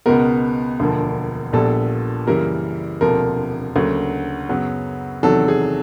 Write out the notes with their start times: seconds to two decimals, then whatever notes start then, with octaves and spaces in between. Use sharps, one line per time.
0.06 C#2 B2 G#3 B3 A#4
0.79 E1 D2 D3 F3 A#3
1.53 A#1 A#2 G3 B3 A4
2.27 F#2 C#3 E3 G3 A#3 A#4
3.01 E1 D2 C3 F3 A#3 A#4
3.75 D2 C#3 F#3 A#3
4.49 F#2 C#3 F#3 B3
5.23 E2 C3 D#3 F#3 A4
5.48 G#4